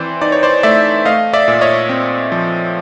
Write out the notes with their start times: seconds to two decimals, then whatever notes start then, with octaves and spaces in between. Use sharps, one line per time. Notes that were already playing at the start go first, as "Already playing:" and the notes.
Already playing: E3 C4 C5 D5
0.21 D#4 D5
0.32 C#5
0.43 C5 D5
0.63 A3 D5 E5
1.05 A3 D#5 F5
1.33 D5 E5
1.48 A#2
1.61 C#5 D#5
1.89 C4
2.32 F3